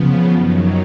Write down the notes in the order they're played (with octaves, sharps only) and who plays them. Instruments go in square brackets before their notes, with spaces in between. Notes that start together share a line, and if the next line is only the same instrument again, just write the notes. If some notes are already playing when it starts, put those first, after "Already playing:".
Already playing: [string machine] C#3 F3 B3
F#2 D#3 F#3